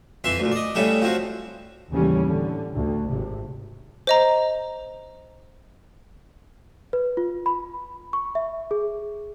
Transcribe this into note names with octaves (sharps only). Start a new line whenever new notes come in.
F2 E3 E5 C6
D2 A#2
D5 D#5
A2 C#3 G3 E4 A4
F3 C4 F#4
D#2 A2 C#3 E3 G3 C#4
D3
D2
G#1 C3
C5 D#5 A#5
B4
F4
B5
C#6
E5
G#4